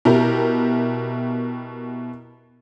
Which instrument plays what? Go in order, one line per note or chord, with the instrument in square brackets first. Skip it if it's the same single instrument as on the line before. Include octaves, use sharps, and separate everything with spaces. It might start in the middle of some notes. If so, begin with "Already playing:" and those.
[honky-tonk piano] B2 E4 G4 A#4